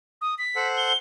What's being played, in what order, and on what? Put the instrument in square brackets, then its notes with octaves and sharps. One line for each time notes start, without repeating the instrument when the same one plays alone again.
[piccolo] D#6
B6
[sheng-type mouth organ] A4 C5 F#5
[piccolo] G7